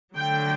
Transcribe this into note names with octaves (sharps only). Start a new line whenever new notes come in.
D3 F#3 A3 G5